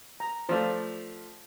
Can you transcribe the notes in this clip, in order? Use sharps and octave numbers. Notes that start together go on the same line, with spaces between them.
A#5
F3 A3 F4 C5 D5